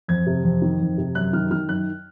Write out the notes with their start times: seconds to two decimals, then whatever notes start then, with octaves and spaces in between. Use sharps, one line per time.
0.08 F2 G#6
0.27 C3
0.44 F2
0.62 D#3
0.80 F2
0.98 C3
1.15 F#2 F#6
1.33 D#3 F6
1.51 D#3 F6
1.69 F#2 F#6